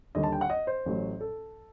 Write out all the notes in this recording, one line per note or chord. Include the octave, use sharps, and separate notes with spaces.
D#2 D3 G3 D#5
A5
G5
F#5
D#5
C5
A1 A2 F#3
A4